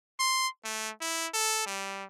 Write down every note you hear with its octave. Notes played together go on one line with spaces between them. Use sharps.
C6
A3
E4
A4
G3